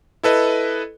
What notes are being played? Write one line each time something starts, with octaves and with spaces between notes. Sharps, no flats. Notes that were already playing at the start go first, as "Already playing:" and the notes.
E4 A4 B4 D#5